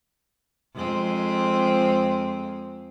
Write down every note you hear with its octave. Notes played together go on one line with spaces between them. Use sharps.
F2 G#3 C4